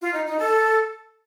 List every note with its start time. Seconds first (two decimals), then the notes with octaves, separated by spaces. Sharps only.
0.01 F4
0.13 D#4
0.25 D#4
0.37 A4